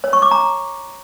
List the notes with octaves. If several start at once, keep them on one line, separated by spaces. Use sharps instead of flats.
C#5
C#6
D6
A#5